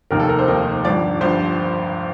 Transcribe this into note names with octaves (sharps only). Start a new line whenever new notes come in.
F1 D#2 D#3 A#3 D#4 A#4
A4
A#4
C5
F1 D#2 D#3 A#3 D#4
G1 G2 F3 D5
G1 G2 F3 C5